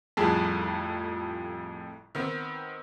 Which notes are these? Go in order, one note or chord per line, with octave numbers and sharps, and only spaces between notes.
G1 F2 A2 G3 G#4 A5
D#3 B3 C4